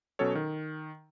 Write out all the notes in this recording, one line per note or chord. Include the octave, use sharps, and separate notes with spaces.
B2 F#3 C#4 A4 C#5
D#3